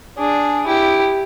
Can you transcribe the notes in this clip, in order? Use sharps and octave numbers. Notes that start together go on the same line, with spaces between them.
D4 G#4
E4 G4